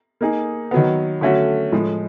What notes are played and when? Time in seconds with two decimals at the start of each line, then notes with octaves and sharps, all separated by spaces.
0.21 A#3 D#4 G#4
0.71 D#3 F#3 B3
1.21 D3 F#3 A3 C#4 F#4
1.72 A2 F3 G#3